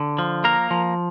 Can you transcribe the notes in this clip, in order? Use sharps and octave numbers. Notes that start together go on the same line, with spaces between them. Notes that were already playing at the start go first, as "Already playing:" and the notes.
Already playing: D3
F3
A#3 A#4
F3